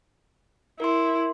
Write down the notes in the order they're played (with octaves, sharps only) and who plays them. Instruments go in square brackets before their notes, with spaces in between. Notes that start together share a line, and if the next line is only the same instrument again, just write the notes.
[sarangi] E4 [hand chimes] A#4 C6